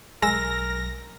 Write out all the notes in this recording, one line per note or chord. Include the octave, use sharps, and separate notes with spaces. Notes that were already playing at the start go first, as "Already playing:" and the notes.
B1 F#3 G#3 A#4 E6 A#6